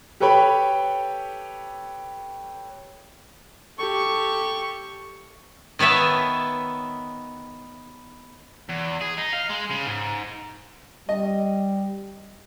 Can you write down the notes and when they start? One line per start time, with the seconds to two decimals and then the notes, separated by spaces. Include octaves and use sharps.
0.20 G4 A4 B4 C#5 G5 B5
3.78 G4 A4 C#6
5.79 D#3 B3 C#5 E5 A5
8.69 E2
9.01 G#4
9.17 D#4
9.33 F5
9.50 G#3
9.70 C#3
9.85 G#2
11.09 G3 D#5